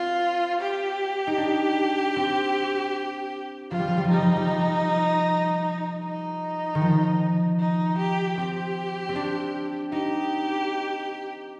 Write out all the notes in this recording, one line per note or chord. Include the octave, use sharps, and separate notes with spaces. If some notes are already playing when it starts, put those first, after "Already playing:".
Already playing: C4 F4
G4
D#4
D4
C4
F3 F4
G3
F3
G3
F3
G3 D#4
F3
G3
F3
D#4
D#3
F3
D#4
G4
C4 G4
C4
D4
D#4 G4